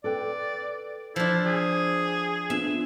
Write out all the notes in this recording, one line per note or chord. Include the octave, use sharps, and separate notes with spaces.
A4 B4 D5 G5
F3 D4 E4
G#4
B3 D4 F4 E5